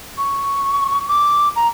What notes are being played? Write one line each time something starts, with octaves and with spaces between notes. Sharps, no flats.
C#6
D6
A#5